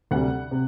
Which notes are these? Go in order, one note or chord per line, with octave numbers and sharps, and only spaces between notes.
D2 C3 G3 F#5
C3